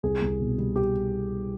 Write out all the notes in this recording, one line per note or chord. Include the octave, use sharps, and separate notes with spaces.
C2 G#4
C2
B2
G3
G4